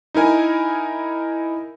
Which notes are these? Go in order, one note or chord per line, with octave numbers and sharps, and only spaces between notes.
D#4 E4 A#4 G#5